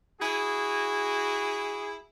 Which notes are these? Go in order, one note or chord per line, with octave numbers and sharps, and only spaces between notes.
E4 F#4 G#4